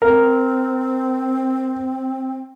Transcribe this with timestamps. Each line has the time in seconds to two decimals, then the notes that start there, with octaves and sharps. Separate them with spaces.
0.02 C4 A#4